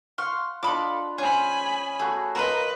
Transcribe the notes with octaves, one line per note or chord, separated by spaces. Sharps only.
F5 F#5 C6 C#6 F6
D4 F4 A4 D#5 B5 D6
C#4 G#4 C5 G#5 B5
A3 F#4 G#4 B5
A#4 B4 D#5 F5 A#5 C6